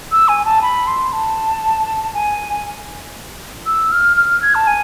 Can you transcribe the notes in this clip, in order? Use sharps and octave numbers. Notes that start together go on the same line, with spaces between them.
E6
G#5
A5
B5
C6
A5
G#5
E6
F6
F6
F6
G#6
A5
G#5